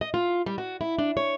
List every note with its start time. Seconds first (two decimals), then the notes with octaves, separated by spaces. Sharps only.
0.01 D#5
0.14 F4
0.46 G3
0.58 F#4
0.81 E4
0.99 D4
1.17 C#5